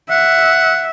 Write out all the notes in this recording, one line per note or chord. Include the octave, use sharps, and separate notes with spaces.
E5 F#5